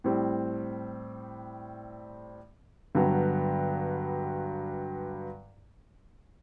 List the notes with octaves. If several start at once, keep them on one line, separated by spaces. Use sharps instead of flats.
A2 G3 C4
G2 D3 F#3 B3